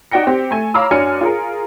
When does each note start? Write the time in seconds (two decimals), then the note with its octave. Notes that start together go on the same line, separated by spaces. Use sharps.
0.11 D#4 F#4 D5 G5 A#6 C#7
0.27 C4 G4
0.51 A3 G#5
0.74 C#5 F5 A#5 B5 D6 E6
0.91 F#2 F#3 D4 G#5 F6 C#7
1.21 F4 G#4 A#4